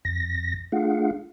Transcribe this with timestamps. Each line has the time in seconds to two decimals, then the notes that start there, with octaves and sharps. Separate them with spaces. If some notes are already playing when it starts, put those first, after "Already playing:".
0.05 F2 A#6
0.72 A3 D4 F4 G#4 F5 F#5